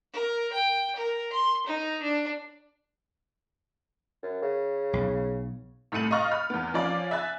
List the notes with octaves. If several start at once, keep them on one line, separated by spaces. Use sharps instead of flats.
A#4
G5
A#4
C6
D#4
D4
F#2
C#3
B1
C2 A2 A3 C#7 D#7 F#7
D#5 F5 A#5 C#6 F6 A6
B5 F6
E2 B3
F3 C#4 D5 F5 D6
E5 G#5 F#6 A6